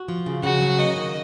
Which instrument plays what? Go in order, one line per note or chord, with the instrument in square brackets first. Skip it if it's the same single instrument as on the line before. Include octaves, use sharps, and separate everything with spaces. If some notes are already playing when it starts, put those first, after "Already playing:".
Already playing: [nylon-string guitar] F#4
F3
C#3
[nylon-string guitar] C#3 [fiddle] F#4
[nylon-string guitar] F#3
[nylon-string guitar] A#3 [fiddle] D#5
[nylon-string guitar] D#3